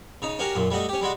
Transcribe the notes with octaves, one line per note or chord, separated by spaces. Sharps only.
C#3 D#4
C#4 F#4 G4 A#4
F#2 A#2
G3 A3 F#4 D#5
C#4 G4
G3 G#3 F#4